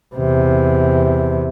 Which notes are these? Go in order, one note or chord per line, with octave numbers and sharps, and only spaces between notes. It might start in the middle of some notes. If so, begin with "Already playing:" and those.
E2 C3